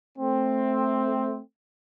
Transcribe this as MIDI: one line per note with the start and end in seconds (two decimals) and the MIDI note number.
0.18 1.40 57
0.18 1.40 60